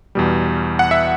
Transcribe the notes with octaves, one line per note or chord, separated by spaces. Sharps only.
E2 B2 G3
F#5
E5